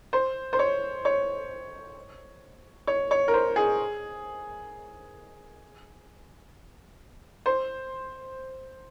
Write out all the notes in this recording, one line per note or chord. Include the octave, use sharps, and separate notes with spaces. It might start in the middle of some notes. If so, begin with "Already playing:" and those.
C5
C5
C#5
C#5
C#5
C#5
A#4
C5
G#4
C5